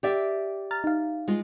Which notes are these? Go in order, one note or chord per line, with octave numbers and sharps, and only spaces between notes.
G4 D5 E5
A#5 F6 A6
D#4 F5
G#3 F4